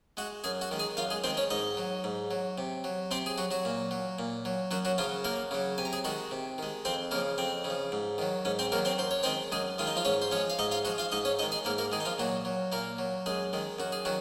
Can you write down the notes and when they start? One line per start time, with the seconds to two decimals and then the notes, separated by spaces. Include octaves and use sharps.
0.17 G#3 F#4 F#5
0.44 F#2 G#4 G#5
0.61 F#4 F#5
0.71 D#3 G#3
0.79 G#4 G#5
0.97 F#2 F4 F5
1.10 G#3 G#4
1.24 D#3 G#3 C4 C5
1.37 C#4 C#5
1.50 G#2 D#4 D#5
1.77 F#3
2.04 G#2
2.31 F#3
2.58 C3
2.84 F#3
3.11 C3 C4 C5
3.26 G#4
3.38 F#3 F#4
3.51 F#3 F#4
3.65 A#2
3.91 F#3
4.19 A#2
4.45 F#3
4.71 F#2 F#3 F#4
4.85 F#3 F#4
4.98 C#3 F3 F#3 F4
5.24 F#2 A#3 A#4
5.51 C#3 F#3
5.78 C3 G#5
5.85 A#5
5.93 G#4 G#5
6.04 D#3 G#3 F#4 F#5
6.31 C3
6.58 D#3 G#3
6.85 F2 C4 C5
7.11 C#3 F3 A#3 A#4
7.38 F2 C4
7.64 C#3
7.70 F3
7.92 G#2
8.18 D#3 F#3
8.45 G#2 C#4
8.59 C4 C5
8.72 D#3 F#3 A#3 A#4
8.85 C4 C5
8.98 F#2 C5
9.11 C#5
9.23 D#3 G#3 C4 C5
9.52 F#2 G#3 G#4
9.78 D#3 G#3 F4
9.87 D#4
9.96 F3 F4
10.05 G#2 C#4 C#5
10.22 C5
10.31 F3 C#4 C#5
10.36 G#3
10.50 F5
10.59 G#2 D#4 D#5
10.72 F4 F5
10.85 F3 G#3 F#4 F#5
10.98 F4 F5
11.12 G#2 D#4 D#5
11.25 C#4 C#5
11.39 D#3 G#3 D#4 D#5
11.52 G#4 G#5
11.65 G#2 A#3 A#4
11.78 A#3 A#4
11.92 D#3 G#3 G#4
12.00 D#4
12.05 F3 F4
12.18 A#2 F#3 F#4
12.45 F#3
12.72 A#2 A#3 A#4
12.98 F#3
13.26 F#2 G#3 G#4
13.53 D#3 G#3
13.79 F#2 F#4
13.92 G#4
14.05 D#3 F#3 F#4